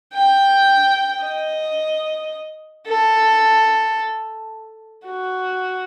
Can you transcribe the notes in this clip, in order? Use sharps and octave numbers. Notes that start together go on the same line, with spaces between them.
G5
D#5
A4
F#4